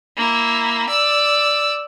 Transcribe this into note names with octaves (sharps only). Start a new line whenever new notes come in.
A#3 E4
D5 E6